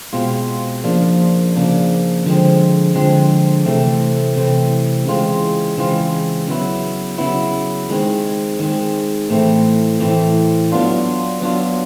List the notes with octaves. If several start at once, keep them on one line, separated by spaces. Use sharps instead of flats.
B2 G#3 C4 F4
C#3 F3 A#3 D4
C#3 F3 A#3 D4
D3 F3 G#3 C4
D3 F3 G#3 C4
C3 E3 A3 C4
C3 E3 A3 C4
C#3 E3 G#3 C4 F4
C#3 E3 G#3 C4 F4
C#3 F#3 B3 E4
C#3 F#3 B3 E4
D#3 G#3 C4
D#3 G#3 C4
A2 E3 A3 C4
A2 E3 A3 C4
F#3 B3 D4 F4
F#3 B3 D4 F4